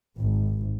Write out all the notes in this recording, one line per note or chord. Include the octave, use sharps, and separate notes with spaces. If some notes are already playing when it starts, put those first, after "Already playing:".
G#1